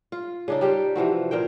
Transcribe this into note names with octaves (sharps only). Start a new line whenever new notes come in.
F4
C#3 D4 D#4
G3 G4 C5
C3 E3 F3 F#4
A#2 A#4 C5 G5